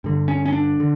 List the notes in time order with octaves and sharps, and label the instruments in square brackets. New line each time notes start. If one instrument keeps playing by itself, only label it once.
[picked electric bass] G2 D3
C#4
C#4
D4
D3